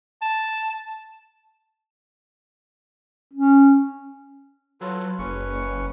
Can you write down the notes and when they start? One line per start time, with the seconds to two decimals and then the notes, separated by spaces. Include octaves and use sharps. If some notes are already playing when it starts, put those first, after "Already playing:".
0.22 A5
3.33 C#4
4.81 F#3 F4 A4 B4
5.19 F#1 C#4 B4 C#6